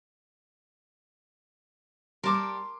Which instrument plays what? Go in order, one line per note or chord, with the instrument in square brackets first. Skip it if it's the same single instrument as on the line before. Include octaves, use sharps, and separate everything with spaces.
[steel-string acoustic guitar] G3 G4 [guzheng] A#4 A5 [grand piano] C6 D6